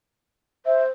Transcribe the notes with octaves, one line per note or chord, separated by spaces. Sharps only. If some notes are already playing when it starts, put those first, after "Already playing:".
C5 E5